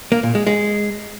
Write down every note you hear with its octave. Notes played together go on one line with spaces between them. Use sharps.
A#3
A#2
G#3
G#3